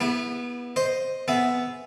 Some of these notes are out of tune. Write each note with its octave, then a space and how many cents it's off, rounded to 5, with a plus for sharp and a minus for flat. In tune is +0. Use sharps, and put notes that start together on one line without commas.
B3 -20 E4 +0 G4 +45
C5 +0 D#5 +0
B3 +5 G#4 +0 E5 +0